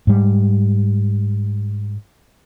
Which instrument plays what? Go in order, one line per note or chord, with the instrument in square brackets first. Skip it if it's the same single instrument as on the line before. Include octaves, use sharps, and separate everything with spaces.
[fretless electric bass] G#2 G3